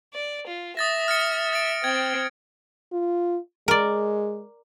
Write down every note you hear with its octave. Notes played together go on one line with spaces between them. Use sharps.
D5
F4
E5 D#6 A6 A#6
F6 A6 C#7
A6 D7
C4 G5 G#6
F4
G#3 A#4 D5